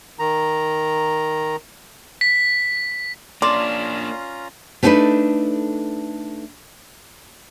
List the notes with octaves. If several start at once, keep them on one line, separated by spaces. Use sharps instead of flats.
D#3 A#5
B6
A#3 C#4 D4 F4 D5 A#5 C6
A3 B3 D4 D#4 A4 B4